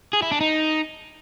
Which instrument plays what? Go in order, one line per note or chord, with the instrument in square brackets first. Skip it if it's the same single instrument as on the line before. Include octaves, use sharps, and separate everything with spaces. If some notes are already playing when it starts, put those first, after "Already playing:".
[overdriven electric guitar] G#4
E4
D4
D#4